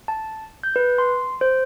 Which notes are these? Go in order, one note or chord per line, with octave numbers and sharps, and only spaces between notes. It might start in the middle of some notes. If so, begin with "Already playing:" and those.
A5
G6
B4
C6
C5